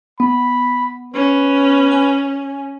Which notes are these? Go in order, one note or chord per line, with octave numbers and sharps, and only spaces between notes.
B3 B5
C#4 B4
G#5